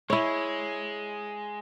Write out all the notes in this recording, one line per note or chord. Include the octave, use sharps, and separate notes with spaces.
G#3 E4 C#5